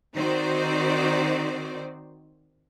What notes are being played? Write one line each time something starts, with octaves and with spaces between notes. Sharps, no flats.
D#3 C4 D#4 F#4 C5 D5